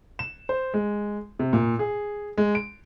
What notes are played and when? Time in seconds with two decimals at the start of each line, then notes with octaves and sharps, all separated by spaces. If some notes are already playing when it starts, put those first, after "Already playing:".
0.19 E7
0.49 C5
0.74 G#3
1.39 C3
1.53 A#2
1.79 G#4
2.38 G#3
2.55 D7